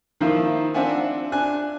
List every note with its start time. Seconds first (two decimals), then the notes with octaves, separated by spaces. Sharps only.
0.21 D#3 F3 A#3 E4 C5
0.74 C4 D4 F4 E5 F#5 G#5
1.32 D4 G#5 F#6